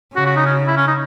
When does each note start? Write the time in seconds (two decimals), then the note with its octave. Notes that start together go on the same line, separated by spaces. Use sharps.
0.15 C#3 F#4
0.26 F#4
0.36 D#4
0.46 C#4
0.67 E4
0.77 C#4
0.87 D#4